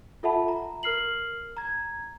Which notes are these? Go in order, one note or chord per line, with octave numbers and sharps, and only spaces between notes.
F4 A4 E5 F#5 A5 B5
A#5
A#4 F6 C7 F#7
A#5 G#6